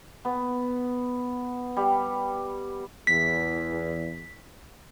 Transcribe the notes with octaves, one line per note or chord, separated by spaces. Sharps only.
B3
G3
E2 B6